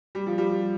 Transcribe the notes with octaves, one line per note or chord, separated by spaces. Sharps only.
G3
F3
G3